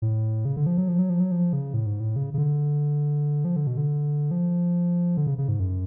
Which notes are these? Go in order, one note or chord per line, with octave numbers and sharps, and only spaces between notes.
A2
C#3
D3
F3
F#3
F3
F#3
F3
F#3
F3
C#3
A2
G#2
A2
C#3
C#3
D3
F3
D3
B2
D3
F3
D3
C#3
C#3
G#2
F#2